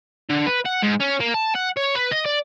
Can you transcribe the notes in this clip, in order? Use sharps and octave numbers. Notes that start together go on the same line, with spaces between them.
D3
B4
F#5
G#2
C#4
A#3
A5
F#5
C#5
B4
D#5
D5